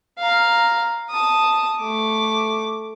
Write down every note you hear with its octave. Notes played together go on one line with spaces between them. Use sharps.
F5 A#5
A5 D#6
A3 D6